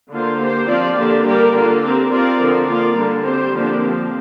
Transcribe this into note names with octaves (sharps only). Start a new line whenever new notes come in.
D3 A#3 F4 C5
A#3 G4 C5
F3 C4 F4 D5
D3 A#3 D4 G4
G3 A#3 G4 A#4 D5
D3 A#3 F4
C4 G4 A#4
C4 F4 A#4 D5
D3 F3 C4
A#3 F4 A#4 D5
D3 G3 A#3
G3 C4 G4 C5
D3 F3 A#3 D4 G4
F3 C4 G4